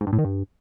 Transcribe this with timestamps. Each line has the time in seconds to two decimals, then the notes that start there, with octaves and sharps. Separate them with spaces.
0.01 G#2
0.07 G2
0.13 A2
0.19 D#3
0.24 G2